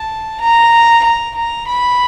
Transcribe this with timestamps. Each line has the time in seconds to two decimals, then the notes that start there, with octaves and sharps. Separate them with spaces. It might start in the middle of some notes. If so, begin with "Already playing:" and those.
Already playing: A5
0.41 A#5
1.04 A#5
1.36 A#5
1.67 B5